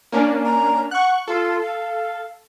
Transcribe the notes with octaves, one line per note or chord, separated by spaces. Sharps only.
A#3 C#4 D4
A#5
F#5 C#6 F#6
F4 A4
F5